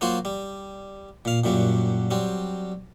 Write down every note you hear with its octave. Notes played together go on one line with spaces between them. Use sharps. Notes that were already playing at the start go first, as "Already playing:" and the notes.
F#3 A#3 F4 F#4 C5
G3
A#2 F5
F#2 A#2 F#3 G3
F#3 G3 C4